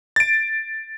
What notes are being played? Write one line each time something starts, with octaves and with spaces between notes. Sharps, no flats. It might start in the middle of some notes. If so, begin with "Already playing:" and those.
A6 D7